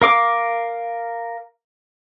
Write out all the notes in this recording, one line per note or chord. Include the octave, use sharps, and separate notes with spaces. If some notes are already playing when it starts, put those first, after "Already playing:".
A#4 F5 D6